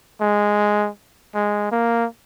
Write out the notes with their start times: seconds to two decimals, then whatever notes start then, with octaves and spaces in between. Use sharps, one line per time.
0.21 G#3
1.34 G#3
1.72 A#3